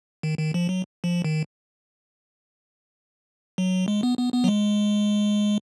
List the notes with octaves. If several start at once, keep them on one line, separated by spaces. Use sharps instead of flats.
D#3
D#3
F3
F#3
F3
D#3
F#3
G#3
B3
B3
B3
F#3
G#3